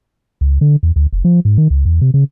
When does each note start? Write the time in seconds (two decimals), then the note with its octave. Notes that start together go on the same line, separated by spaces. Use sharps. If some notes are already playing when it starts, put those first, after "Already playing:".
0.41 C#2
0.61 D3
0.83 E2
0.96 D2
1.13 F1
1.25 F3
1.45 G#2
1.58 D#3
1.70 C#2
1.85 E2
2.01 C3
2.14 C#3